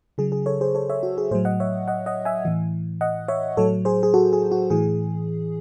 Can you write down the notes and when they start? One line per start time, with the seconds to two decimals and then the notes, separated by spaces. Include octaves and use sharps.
0.18 C#3 F#3 G#4
0.32 G#4
0.46 A4 C#5
0.61 G#4 C5
0.75 A4 C#5
0.90 C#5 E5
1.03 F#4
1.18 G#4
1.31 A2 G#4 C5
1.35 F#3
1.45 D#5 F#5
1.60 C#5 E5
1.88 D#5 F#5
2.06 D#5 F#5
2.25 E5 G#5
2.45 A2 E3
3.01 D#5 F#5
3.28 C#5 E5
3.57 A2 F#3 A4 C#5
3.85 G#4 C5
4.03 G#4
4.14 F#4 A4
4.33 G#4
4.52 F#4
4.70 A2 E3 G#4